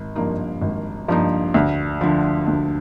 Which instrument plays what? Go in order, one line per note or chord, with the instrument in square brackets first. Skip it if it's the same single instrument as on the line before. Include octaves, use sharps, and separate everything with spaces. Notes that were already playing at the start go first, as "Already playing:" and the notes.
Already playing: [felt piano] G#1
G2 F3 A#3 D#4
G#1
G2 F3 A#3 D#4
D2
D3 F3
D2